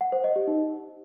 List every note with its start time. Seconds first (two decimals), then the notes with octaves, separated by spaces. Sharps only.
0.01 F#5
0.12 C5
0.24 D#5
0.36 G4
0.47 D#4